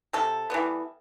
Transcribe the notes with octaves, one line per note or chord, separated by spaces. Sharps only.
C3 A4
E3 G3 B3